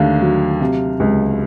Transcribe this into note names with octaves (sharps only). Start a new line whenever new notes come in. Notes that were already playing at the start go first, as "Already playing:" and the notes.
Already playing: D#2 D3 A3 F5
F#3
C3
C#2